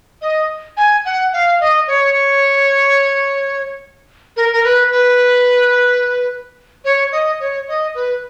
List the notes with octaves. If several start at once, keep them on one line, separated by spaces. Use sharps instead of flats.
D#5
G#5
F#5
F5
D#5
C#5
A#4
A#4
B4
B4
C#5
D#5
C#5
D#5
B4